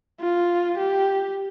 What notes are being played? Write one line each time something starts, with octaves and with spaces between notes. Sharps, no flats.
F4
G4